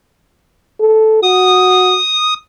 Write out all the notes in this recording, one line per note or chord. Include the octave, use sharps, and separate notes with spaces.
A4
F#4 D#6